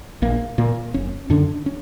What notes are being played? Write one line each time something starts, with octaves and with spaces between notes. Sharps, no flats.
A#1 A#3
A#2 A#3
F#1 C#4
F#2 D3 D4
C#4